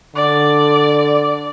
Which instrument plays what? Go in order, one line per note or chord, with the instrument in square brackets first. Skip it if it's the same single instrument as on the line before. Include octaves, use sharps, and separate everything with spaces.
[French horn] D3 [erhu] D5